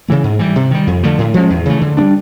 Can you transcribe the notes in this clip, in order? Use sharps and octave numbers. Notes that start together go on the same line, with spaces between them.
C#3 E3 A3
G#2
E3 G3
C3
D#3 G3
F2
D3 F3 A3
A2
F3 G#3 C#4
E2
C#3 E3 A3
D3
G3 B3 D4